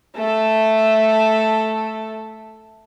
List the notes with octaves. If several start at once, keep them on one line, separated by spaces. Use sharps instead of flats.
A3 A4